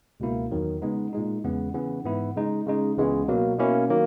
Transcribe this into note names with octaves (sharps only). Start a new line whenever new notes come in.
C#2 B2 A#3 E4
E2 D#3 F#3
C#3 G#3 B3 D#4
A#2 G#3 D#4
E2 C#3 E3 G#3 B3
C#3 E3 B3
G#2 E3 B3 E4
C#3 G#3 D#4
C#3 G#3 D#4
C#2 C#3 E3 G#3 B3
B2 F#3 A#3
B2 A#3 C#4 E4
D#3 F#3 A#3